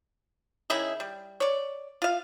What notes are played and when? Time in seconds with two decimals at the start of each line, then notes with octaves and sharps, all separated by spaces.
0.70 D#3 C#4 E4 G#4
1.00 G3
1.40 C#5 D5
2.02 F4 F5